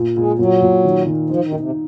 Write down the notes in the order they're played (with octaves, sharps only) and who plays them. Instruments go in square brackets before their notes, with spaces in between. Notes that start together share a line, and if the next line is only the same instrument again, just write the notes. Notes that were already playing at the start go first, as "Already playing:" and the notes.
Already playing: [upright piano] A#2
[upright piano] A#2 [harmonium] G#3
[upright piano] A#2 [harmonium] F#3
[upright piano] A#2
D#3
D#3
[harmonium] F3 [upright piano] D#4
[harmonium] D#3
[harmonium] A#2 [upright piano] D#4
[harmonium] C3